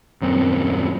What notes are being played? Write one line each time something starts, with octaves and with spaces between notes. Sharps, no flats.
D#1 F#2 C4